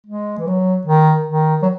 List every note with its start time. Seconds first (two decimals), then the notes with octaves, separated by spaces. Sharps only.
0.06 G#3
0.38 E3
0.47 F#3
0.87 D#3
1.27 D#3
1.62 F#3